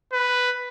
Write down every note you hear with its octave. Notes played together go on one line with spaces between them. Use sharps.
B4